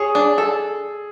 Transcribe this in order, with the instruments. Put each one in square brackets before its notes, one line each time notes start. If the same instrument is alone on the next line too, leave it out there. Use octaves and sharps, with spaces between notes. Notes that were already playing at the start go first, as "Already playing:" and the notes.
Already playing: [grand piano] G#4 [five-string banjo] C#5
[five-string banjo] D4
A4